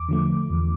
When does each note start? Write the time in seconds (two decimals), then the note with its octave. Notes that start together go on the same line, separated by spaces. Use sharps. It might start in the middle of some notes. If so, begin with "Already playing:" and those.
Already playing: E2 D6
0.09 D3 F3 A3
0.50 E2